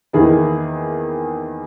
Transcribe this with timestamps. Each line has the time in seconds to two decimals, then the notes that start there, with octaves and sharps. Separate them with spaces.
0.13 E2 D#3 A#3 E4 G#4